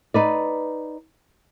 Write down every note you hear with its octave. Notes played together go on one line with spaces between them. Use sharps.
D#4 B4 D5